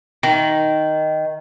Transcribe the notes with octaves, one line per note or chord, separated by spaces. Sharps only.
D#3